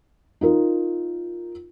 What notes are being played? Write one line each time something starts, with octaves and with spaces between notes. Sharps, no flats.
D#4 F4 A#4